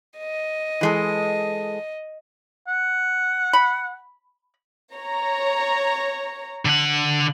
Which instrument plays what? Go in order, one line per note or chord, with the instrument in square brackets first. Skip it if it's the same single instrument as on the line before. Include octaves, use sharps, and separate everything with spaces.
[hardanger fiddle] D#5
[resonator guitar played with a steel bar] E3 G#3 A4
[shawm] F#5
[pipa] B5
[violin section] C#5 A#5
[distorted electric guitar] D3 F#5